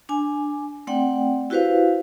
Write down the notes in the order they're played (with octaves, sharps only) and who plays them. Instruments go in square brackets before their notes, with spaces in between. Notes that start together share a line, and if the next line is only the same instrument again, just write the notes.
[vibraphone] D4 G#5
A3 C4 D5 F#5 G5
E4 F#4 G4 B4 C5 F5